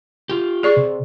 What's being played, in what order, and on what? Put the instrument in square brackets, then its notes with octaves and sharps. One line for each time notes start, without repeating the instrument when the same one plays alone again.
[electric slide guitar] F4 G4
[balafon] G#4 D5 C#6
[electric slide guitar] C3